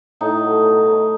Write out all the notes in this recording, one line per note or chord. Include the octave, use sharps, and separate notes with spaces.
A2 D#4
F#3 A3
B2
A3